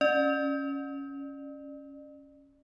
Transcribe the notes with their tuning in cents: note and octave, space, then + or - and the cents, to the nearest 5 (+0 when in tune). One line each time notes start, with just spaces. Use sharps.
C#4 +0 D5 +35